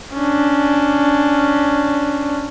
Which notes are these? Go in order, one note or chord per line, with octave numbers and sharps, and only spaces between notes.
C#4 D4